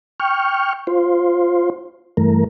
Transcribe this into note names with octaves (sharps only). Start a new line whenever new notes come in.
G5 C#6 F6
F4 C5
G2 E3 A3 A#4